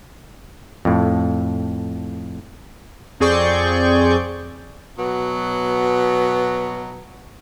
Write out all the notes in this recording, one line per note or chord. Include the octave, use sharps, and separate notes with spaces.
F2 A2
F2 C4 G#4 D5 C#6 G6
B2 F#3 B3